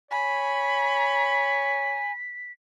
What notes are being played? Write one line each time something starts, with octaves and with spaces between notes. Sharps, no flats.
C#5 G#5 B5 B6